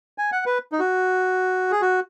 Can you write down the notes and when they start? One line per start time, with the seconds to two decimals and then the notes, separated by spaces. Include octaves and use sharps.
0.18 G#5
0.32 F#5
0.46 B4
0.72 D#4
0.79 F#4
1.71 G#4
1.82 F#4